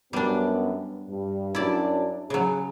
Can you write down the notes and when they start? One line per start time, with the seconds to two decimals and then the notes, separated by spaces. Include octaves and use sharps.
0.13 F#2 G3 B3 D4
1.08 G2
1.55 F#2 F#3 D4 E4 D5
2.30 C#3 F#3 G#4